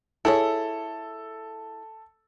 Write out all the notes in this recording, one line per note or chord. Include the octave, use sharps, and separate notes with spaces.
E4 G#4 A4 C#5